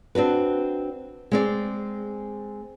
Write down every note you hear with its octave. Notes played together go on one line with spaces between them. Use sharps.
C4 D4 F#4 B4
G#3 C4 D5